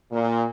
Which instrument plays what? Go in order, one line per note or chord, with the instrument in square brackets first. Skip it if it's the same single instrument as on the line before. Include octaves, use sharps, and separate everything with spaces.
[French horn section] A#2